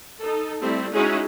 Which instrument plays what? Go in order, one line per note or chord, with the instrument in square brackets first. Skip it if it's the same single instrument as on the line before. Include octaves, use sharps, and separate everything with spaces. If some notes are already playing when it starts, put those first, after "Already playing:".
[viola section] D#4 A4
G3 A3 C4 E4
G#3 C#4 D#4 E4 F#4 G#4